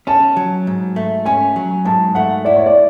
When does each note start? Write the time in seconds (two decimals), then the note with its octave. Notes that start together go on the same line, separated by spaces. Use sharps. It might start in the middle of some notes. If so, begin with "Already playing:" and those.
0.07 C#4 A5
0.37 F#3
0.67 G#2
0.96 A3
1.26 C#4 G#5
1.56 F#3
1.85 G#2 A5
2.15 A3 F#5
2.45 E4 D5
2.56 C#5
2.66 D5